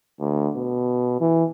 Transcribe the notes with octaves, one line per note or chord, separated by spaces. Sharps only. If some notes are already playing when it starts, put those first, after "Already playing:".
D2
B2
E3